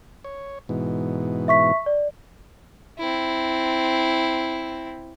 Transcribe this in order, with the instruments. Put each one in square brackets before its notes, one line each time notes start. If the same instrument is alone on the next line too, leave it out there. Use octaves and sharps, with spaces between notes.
[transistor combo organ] C#5
G#2 B2 E3
[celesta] E5 C#6 B6
D5
[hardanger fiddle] C4 E4